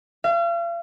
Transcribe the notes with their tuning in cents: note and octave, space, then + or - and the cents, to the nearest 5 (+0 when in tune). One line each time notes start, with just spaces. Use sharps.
F5 -40